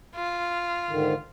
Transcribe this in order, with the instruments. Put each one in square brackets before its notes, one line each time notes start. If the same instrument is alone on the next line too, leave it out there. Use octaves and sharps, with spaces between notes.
[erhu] F4
[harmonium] G#2 D3 D#3